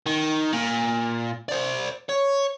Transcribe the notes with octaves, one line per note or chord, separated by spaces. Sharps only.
D#3
A#2
C5 D5
C#5